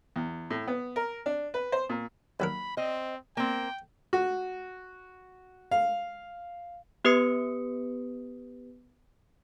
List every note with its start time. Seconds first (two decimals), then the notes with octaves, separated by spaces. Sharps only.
0.16 E2
0.50 A2
0.67 B3
0.96 A#4
1.26 D4
1.54 B4
1.72 C5
1.89 A#2
2.40 D#2 F#3 A#4 B5
2.77 C4 C5 D#5
3.37 A#3 C4 G5
4.13 F#4
5.71 F5
7.05 B3 G4 B4 D#6 C#7